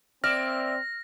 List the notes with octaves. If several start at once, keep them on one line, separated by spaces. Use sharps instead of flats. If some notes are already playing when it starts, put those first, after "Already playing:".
A#3 C4 D5 E5 F6 A#6